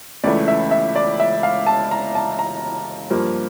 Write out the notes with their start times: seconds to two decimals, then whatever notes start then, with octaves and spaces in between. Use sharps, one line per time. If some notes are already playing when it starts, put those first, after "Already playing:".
0.24 C#2 C#3 E3 A3 D5
0.48 E5
0.71 E5
0.96 D5
1.20 E5
1.43 F5
1.66 A5
1.91 A#5
2.15 A5
2.39 A#5
3.11 G2 F3 A#3